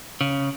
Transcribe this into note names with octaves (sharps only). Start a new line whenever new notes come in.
C#3